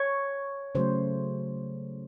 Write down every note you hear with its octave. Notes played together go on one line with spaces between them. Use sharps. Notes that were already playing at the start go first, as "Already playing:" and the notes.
Already playing: C#5
C#3 F#3 A3 C5